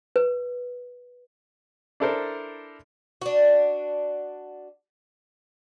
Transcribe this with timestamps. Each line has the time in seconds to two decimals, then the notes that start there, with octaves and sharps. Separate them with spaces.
0.16 B4
2.00 D4 E4 A4 A#4 C5
3.21 D4 F#4